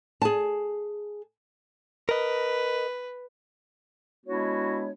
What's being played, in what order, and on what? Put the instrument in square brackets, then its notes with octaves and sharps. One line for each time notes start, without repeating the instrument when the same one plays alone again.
[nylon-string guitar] G#4 A5
[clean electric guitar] A#4 D#5 [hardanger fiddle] B4
[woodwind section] G#3 B3 D4 E4 F#4 C#5